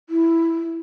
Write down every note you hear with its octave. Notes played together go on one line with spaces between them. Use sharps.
E4